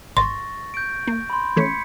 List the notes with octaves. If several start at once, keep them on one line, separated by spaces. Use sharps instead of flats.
G#1 C6 C#6 A6 A#6
G6 D7
A#3
B5 C6
E3 A3 C#4 G#6 B6 C#7